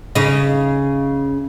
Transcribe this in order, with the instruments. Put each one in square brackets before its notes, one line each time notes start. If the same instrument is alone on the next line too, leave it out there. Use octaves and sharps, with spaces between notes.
[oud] C#3 D#4